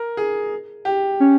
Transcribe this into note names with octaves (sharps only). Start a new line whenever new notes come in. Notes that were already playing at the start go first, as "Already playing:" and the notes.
Already playing: A#4
G#4
G4
C#4